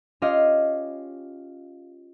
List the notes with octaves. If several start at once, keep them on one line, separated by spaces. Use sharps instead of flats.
C#4 F4 G4 C#5 D#5 F5